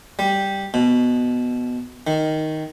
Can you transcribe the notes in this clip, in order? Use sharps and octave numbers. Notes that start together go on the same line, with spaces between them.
G3
B2
D#3